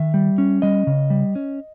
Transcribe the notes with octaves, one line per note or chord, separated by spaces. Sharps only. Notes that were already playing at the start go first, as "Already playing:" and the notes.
Already playing: D#3 E5
G3
C#4
G3 D#5
C#3
G3
C#4